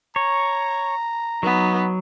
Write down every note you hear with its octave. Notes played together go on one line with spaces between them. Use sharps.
C#5 A#5
F#3 B3 D#4